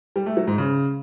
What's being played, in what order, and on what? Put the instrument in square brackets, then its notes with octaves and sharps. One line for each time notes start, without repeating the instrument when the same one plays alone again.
[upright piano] G3
A3
F#3
G#2
C#3